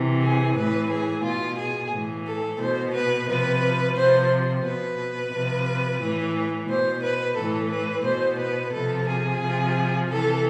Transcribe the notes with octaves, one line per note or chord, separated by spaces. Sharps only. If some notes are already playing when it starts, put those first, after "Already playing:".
Already playing: C3 E3
G#4
A2 E3 B4
G#4
B2 F4
G#4
A2 E3
A4
B2 C5
B4
C3 F3 B4
C3 F3 C5
B2 B4
C3 F3
A2 E3
B2 C5
B4
A2 E3 A4
B4
B2 C5
B4
C3 F3 A4
G#4
C3 F3
C3 E3 A4